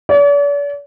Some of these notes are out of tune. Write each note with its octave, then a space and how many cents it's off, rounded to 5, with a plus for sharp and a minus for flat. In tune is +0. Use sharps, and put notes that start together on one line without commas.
D5 -45